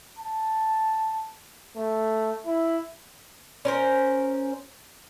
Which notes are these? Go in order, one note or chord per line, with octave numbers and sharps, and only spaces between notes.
A5
A3
E4
C#4 A#4 C5